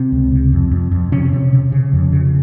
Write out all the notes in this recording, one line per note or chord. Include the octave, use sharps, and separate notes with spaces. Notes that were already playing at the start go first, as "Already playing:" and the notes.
Already playing: C3 C4
C#2
C3
F2
F2
F2
C3 C#4
C3
C3
C#3
F2
C#3